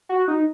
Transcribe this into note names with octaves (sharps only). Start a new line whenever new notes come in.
F#4
D#4